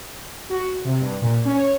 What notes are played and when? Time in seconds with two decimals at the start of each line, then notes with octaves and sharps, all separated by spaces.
0.50 F#4
0.85 C3
1.01 G2
1.22 A#2
1.45 C#4
1.57 C#5